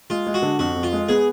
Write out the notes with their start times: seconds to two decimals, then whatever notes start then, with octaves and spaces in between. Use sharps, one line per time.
0.10 G#3 F4
0.27 G#3
0.34 F#4
0.42 D3
0.59 F2 F#4
0.75 F2
0.83 F4
0.93 G#3
1.09 B3 G#4